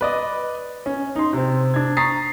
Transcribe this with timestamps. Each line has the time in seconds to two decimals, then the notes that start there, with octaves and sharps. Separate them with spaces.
0.01 B4 D5 D#5
0.86 C#4
1.16 D#4 C6
1.33 C3 C4
1.74 D4 G#6
1.97 A#5 C#6 D#6 A6 B6 C7